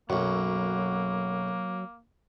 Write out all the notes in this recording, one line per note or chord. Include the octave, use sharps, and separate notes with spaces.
B1 F#2 F#3 A#3